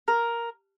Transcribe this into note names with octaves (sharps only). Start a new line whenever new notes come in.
A#4